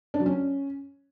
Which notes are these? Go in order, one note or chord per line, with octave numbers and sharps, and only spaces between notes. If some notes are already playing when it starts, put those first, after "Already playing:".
D4
F#3
C#4